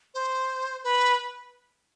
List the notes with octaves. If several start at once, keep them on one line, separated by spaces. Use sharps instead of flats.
C5
B4